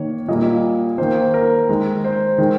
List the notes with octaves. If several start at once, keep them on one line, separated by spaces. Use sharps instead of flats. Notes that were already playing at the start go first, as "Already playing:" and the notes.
Already playing: D#3 A#3 C#5
A#2 G3 A#3 D#5
D#3 A#3 C5
A#4
D#3 G#3
C5
D#3 G#3